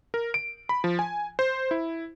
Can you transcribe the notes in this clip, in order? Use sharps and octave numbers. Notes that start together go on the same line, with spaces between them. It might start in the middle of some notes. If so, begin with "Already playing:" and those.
A#4
D7
B5
F3
G#5
C5
E4